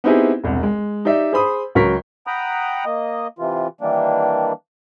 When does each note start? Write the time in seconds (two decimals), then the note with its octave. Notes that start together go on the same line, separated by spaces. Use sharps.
0.04 B3 C4 D#4 E4 G4 G#4
0.44 E1 C2
0.63 G#3
1.05 D#4 G4 D5 E5
1.33 G#4 C5 B5 D#6
1.75 C#2 F#3 A#4 C#6 B6
2.27 F#5 G5 A#5 B5 D#6
2.86 A#3 D#5
3.39 C3 E3 F4
3.81 D#3 E3 G3 A#3 D4